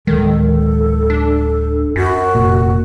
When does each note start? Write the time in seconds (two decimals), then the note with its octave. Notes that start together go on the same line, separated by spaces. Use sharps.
0.07 D1 D#3 G#3 A4
1.10 D4
1.96 F#2 F#4
2.35 F1 A#2